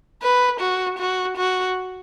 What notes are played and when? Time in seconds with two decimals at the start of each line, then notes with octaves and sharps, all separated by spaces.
0.22 B4
0.60 F#4
0.99 F#4
1.37 F#4